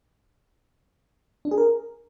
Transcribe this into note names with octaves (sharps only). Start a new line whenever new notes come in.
D4
G#4
A#4